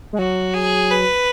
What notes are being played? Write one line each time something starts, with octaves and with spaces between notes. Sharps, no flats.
G#3
F#3 F#4
G#4
B4